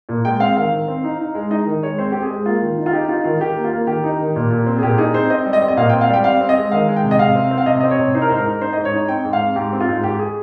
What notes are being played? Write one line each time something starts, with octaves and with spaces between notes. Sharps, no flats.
A#2
G#3 G5
C4 F5
D#3 F5
D#3
C4
D#4
D#4
G#3
D#4 D#5
D#3
G#3 C#5
C4 C5
C4 G4
G#4
G#3
A#3 F4
D#3
D#4
F4
D#4 G4
D#4 F4
D#3 F4
D#3 G4
A#3
F4
A#3
D#3 G4
D#4
D#3
A#2
A#2
C4
G#4
A#2 G4
D#4 G#4
C4 C5
C4 D#5
G3
D#5
C4
D#5
A#2 F5
C4 G5
F5
G3 G5
C4 F5
C4
D#5
G#3
D#3 F5
G#3
G5
C3
D#5
C3 F5
C4
C4
F5
C3 D#5
C4 D#5
C#5
C3
D#4 C5
A#4
G#2 C5
A#4
D#4
D#4 C5
G#2 D#5
C#5
D#4
C4 G5
G#2
F5
C4
G#2 G4
C4
F4
G#2
G#2 G4
G4
G#4